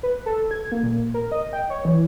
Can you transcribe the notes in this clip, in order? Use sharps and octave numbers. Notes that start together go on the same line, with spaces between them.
B4
A4
G#6
A#3
A#2
A#4
D#5
G5
C#5
E3